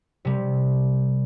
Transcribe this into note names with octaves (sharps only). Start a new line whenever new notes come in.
C3 G3